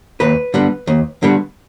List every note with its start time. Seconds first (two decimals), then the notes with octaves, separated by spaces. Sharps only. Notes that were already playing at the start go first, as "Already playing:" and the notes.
0.20 D#2 B4
0.54 D3 G3 B3
0.87 D#2
1.23 D3 G3 B3